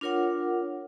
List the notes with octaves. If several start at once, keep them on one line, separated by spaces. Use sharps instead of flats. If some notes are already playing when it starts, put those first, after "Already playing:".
D4 F4 A#4 C#5 F#5